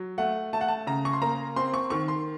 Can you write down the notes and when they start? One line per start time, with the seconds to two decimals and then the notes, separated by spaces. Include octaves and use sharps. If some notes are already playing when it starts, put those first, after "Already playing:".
Already playing: F#3
0.18 A3 F#5
0.53 A3 A5
0.61 F#5
0.68 A5
0.87 C#3 A#5
1.05 C#6
1.13 C6
1.22 A#3 A#5
1.56 C4 C6
1.74 C#6
1.90 D#3 C#6
2.08 C6